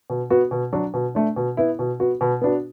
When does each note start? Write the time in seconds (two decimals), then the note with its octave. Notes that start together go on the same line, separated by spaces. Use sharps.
0.10 B2
0.30 B3 F#4
0.51 B2
0.73 F#3 D4 F#4
0.94 B2
1.15 A3 D4
1.36 B2
1.57 B3 E4
1.79 B2
2.00 B3 F#4
2.21 B2
2.42 B3 D4 F#4